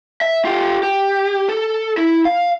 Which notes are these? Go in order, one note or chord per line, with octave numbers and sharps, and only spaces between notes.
E5
F4 G4
G4
A4
E4
F5